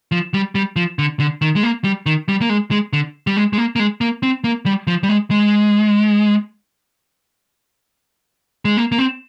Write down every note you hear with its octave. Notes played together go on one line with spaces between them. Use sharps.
F3
G3
G3
F3
D3
D3
D#3
G#3
A#3
G3
D#3
G3
A#3
G#3
G#3
D3
G3
G#3
G#3
A#3
A#3
G#3
A#3
C4
A#3
G3
F3
G3
G#3
G#3
G#3
A#3
A#3
C4